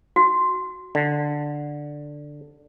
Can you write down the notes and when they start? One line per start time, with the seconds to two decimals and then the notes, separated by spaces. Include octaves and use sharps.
0.16 F#4
0.95 D3